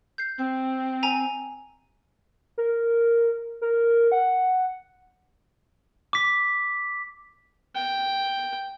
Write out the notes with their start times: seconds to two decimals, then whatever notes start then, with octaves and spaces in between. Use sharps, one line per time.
0.18 G6 C7
0.38 C4
1.03 G#5 A#5 D#7
2.58 A#4
3.62 A#4
4.12 F#5
6.13 D6 B6
7.75 G5